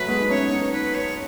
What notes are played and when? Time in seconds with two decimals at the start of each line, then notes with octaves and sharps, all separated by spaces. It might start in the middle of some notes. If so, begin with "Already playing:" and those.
Already playing: F#3 A3 B4
0.08 G#3 B3
0.20 D#4
0.29 A3 C#4 C#5
0.51 B3 D#4
0.72 B4
0.95 C#5